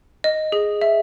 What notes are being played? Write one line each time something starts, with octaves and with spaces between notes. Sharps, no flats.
D#5
G#4
E5